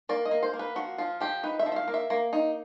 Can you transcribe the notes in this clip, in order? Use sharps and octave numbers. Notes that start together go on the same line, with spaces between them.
A#3 D5
D#5
A#3
C5
A#3
B4
F3 F#4
F3 F4
F3 G4
D#4 B4
E5
F3
E5
F5
A#3
E5
A#3
D#4